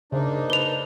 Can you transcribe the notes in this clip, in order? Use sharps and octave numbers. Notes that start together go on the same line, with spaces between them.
C#3 A#3 D4 D#4 C5
B4 F7 G7